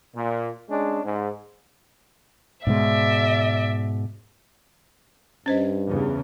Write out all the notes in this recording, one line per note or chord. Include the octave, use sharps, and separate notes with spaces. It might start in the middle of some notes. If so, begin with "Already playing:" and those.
A#2
G#3 C#4 D4
G#2
G#2 B2 G#3 D5 E5
G2 C#4 C5 D#5
E2 C#3